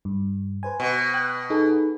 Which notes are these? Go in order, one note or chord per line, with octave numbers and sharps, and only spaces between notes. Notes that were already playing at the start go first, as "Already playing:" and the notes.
G2
B4 C5 G#5
B2
G5 F#6
D#4 G#4 A4